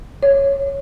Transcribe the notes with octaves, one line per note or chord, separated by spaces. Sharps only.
C#5